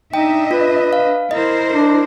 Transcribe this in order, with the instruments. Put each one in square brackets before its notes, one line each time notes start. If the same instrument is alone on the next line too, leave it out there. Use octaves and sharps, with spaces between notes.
[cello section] D4 D#5 E5 [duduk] D#4 [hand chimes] G5
[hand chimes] F4 [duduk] B4
[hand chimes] F5
[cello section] E4 A#4 C5 [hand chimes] D#5
[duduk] D4